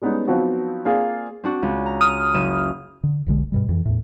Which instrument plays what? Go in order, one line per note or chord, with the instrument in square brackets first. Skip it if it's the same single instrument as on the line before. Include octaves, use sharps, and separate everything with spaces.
[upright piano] G3 G#3 B3 C#4 D#4
F3 F#3 B3 C4 D#4 F#4
A#3 C4 F4 G#4 D5 G#5
[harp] C4 D4 F#4
C#2
A#5
[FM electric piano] D#6 F6
[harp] F#1 D#7 E7
[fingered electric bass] D3
E1 B1 D3 G#3
G2 B2 G3
F2 E3
E2 A2